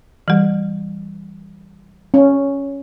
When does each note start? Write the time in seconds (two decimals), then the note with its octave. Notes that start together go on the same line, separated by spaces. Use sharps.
0.28 E3 G3
2.14 C#4